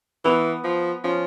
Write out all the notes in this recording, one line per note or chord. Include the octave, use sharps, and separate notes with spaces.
E3 B3
F3
F3 C#4